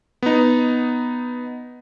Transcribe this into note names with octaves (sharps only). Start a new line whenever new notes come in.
B3 D#4